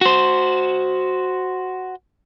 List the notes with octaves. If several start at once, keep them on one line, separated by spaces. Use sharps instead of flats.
F#4 C5